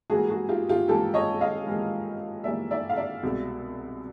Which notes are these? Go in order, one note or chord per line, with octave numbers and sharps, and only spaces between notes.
G#2 E3 G3 A#3 F#4 G#4
F#4 G#4
F4 G4
F4 G4
G#2 E3 G3 A#3 G4 A4
C#5 D#5
D#5 F5
G#2 E3 G3 A#3
G#2 E3 G3 A#3 D5 E5
D5 E5
F5
D5 E5
C2 B2 G#3